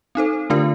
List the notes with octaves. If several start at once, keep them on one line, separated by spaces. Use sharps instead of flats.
C4 D#4 A4 C5
D3 A3 D4 F4 A#4